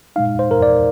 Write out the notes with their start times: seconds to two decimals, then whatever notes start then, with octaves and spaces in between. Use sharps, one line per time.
0.16 A#2 G#3 D#4 F5
0.39 C5
0.51 A#4
0.62 D5